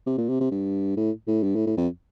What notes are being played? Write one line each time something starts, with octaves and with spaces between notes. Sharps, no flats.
C3
A#2
C3
C3
G2
A2
A2
G2
A2
A2
F2